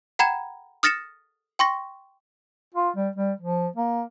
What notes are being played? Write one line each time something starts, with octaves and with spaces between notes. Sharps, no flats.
F#5 G5 A#5 B5 G#6 E7
D#6 F6 A6 A#6 C#7 E7
G5 C6 C#6 A#6
F4
G3
G3
F3
A#3